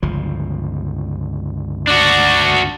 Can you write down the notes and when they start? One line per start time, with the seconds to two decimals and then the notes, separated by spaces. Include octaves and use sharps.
0.03 G1 C#2 F3
1.88 D4 F#4 D5